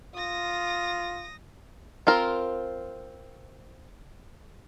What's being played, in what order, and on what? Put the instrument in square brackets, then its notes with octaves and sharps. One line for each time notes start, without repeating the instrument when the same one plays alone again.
[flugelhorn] F4 [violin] D#6 A#6
[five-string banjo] C4 F4 A#4